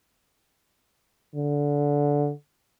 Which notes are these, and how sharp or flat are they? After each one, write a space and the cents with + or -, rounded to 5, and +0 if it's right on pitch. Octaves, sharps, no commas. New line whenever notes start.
D3 -15